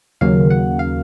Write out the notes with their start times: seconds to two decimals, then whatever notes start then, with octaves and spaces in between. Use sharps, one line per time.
0.21 D#2 C#3 F#3 A#3 F5
0.50 F#5
0.79 F5